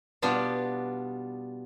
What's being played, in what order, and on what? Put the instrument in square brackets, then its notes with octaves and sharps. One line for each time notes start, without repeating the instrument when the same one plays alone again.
[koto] B2 G3 B3 D4 F4